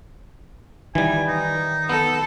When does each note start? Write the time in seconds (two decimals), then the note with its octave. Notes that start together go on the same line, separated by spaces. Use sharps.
0.95 D#3 E3 G3 G#5
1.28 D#4
1.89 B3 A4